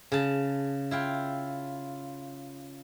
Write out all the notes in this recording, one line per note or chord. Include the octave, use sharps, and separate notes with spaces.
C#3 A5
E4 F4 G5